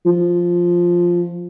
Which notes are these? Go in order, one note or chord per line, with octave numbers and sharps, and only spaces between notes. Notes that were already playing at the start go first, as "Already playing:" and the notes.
F3